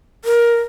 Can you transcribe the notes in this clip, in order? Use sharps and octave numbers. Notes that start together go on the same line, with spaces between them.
A#4